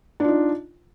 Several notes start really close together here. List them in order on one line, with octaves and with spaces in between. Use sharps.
D4 F4 D#4